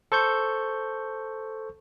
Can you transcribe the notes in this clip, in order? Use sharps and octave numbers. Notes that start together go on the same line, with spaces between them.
A4 C5 C#6 G6